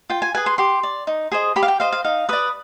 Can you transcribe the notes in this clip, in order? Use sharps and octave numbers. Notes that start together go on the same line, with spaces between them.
F4 G5
G#5
G#4 B4 G#5
C6
G4 C6
D5
D#4
G#4 C5 D#5
G4 B5
F5
G5
C5 D#5 F5
F5
D#4 F5
B4 D5 D#6